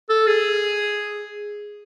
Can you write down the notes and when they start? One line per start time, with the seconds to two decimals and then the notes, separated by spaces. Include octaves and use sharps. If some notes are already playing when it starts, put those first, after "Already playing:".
0.09 A4
0.27 G#4